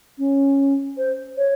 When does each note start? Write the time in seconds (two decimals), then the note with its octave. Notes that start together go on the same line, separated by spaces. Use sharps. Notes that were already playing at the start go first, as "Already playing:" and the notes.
0.18 C#4
0.97 C5
1.37 C#5